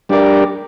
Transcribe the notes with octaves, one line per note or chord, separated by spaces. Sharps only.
G3 D4 G4 A#4 D5